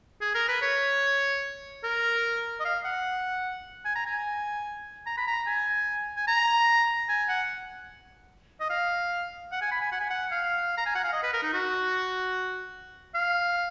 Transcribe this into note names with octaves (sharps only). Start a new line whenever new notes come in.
G#4
A#4
B4
C#5
A#4
D#5
F5
F#5
G#5
A#5
G#5
A#5
B5
A#5
G#5
G#5
A#5
G#5
F#5
D#5
F5
F#5
G#5
B5
G#5
F#5
G#5
F#5
F5
A#5
G#5
F#5
F5
D#5
B4
A#4
D#4
F#4
F5